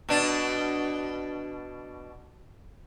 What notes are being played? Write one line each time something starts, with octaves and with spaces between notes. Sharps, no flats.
B2 D4